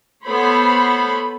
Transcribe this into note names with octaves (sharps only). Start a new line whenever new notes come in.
B3 A4 C5 C#5 B5